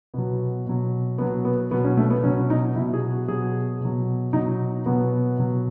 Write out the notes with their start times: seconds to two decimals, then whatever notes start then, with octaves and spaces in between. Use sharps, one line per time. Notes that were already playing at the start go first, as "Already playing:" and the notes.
0.14 B2 F#3 B3
0.66 B2 F#3
1.18 B2 F#3 B3
1.45 B3
1.71 B2 F#3 B3
1.84 C#4
1.97 A3
2.10 B3
2.24 B2 F#3 C#4
2.50 D#4
2.75 B2 F#3 E4
2.94 G#4
3.11 F#4
3.28 B2 F#3 G#4
3.80 B2 F#3
4.33 B2 F#3 D#4
4.86 B2 F#3 B3
5.38 B2 F#3